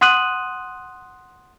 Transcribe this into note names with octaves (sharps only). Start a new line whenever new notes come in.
F#5 C6 D#6 F#6 D#7 F#7